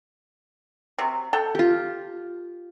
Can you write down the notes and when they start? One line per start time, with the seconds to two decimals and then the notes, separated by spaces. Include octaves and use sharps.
0.98 C3 F#3
1.33 A4 F#5 G5
1.55 F4 G4